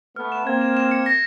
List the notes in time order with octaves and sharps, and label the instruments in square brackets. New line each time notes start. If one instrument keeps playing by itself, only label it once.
[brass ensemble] A3 B3 [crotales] F6
[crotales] E7
[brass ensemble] A#3 C4 [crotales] G#6
[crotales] E7
E7
C#7
A#6